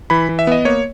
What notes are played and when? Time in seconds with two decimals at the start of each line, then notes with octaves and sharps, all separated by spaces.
0.10 E3 B5
0.29 E3
0.39 E5
0.47 B3 D#5
0.65 A#3 C#5